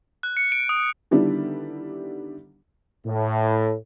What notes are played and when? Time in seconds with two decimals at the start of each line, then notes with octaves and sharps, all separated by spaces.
0.23 F#6
0.37 C#7
0.52 D7
0.69 D#6
1.11 D3 D#3 G3 B3 D4 E4
3.06 A2